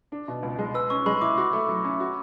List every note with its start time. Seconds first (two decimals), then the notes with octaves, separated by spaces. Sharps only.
0.12 D4
0.28 B2
0.43 C#2
0.59 G#3
0.74 B4 E6
0.90 C#4 C#6
1.06 G#3 B5
1.21 E4 D6
1.38 F#4
1.53 A3
1.69 F#3
1.84 C#4
2.00 F#4